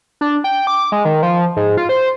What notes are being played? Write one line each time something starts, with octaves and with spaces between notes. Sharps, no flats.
D4
G5
D6
G#3
D#3
F3
G#2
F4
C5